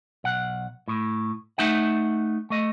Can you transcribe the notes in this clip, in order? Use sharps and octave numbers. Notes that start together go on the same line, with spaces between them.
B1 F#5
A2
A3 D#4 E5 F#5
A3 D#5